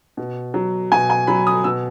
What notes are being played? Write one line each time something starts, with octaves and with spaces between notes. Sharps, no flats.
B2
F#3
B2 G#5
G#5
F#3 B5
D#6
B2 E6